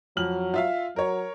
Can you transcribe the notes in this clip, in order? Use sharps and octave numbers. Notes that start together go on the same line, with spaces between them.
F2 F#3 F6 F#7
F4 E5 F5
F#3 A#4 C#5